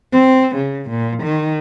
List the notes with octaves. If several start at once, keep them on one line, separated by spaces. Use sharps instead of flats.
C4
C#3
A#2
D#3